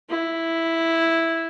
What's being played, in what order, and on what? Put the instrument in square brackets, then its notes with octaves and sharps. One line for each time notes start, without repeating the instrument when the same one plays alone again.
[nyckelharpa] E4